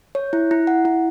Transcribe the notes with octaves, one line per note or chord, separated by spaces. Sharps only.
C#5
E4
E4
F#5
E4